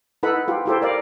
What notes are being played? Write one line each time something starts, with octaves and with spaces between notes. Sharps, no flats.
D#4 E4 A4 B4 F#5 B5
F4 G4
E4 G4 A4 C5
A#4 D5 F5